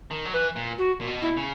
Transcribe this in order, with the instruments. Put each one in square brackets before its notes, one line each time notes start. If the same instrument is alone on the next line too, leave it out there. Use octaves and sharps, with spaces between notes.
[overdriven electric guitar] D#3
F#3
[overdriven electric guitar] E3 [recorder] B4
[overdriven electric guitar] A#2
[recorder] F#4
[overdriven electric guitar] A#2
B2
[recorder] E4
[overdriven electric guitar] C#3